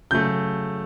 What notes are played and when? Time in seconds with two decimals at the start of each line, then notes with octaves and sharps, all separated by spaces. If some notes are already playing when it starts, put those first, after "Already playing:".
0.11 C#3 F#3 A3 G6